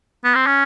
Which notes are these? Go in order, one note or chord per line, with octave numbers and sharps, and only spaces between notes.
B3
C4
C#4